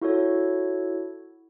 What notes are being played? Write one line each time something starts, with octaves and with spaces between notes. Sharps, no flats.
E4 F#4 A4 C#5